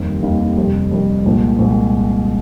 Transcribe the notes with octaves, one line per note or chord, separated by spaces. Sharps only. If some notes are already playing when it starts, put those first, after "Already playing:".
Already playing: F1 D#2 D#3 G3 C4
F1 D#2 D#3 G3 C4
F1 F2 C3 G3
F1 F2 C3 G3
C2 A#2 F3 G#3 C4
C2 A#2 F3 G#3 C4